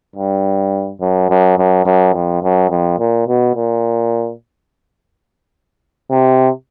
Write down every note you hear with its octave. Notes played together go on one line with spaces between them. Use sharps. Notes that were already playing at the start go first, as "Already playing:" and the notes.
G2
F#2
F#2
F#2
F#2
F2
F#2
F2
A#2
B2
A#2
C3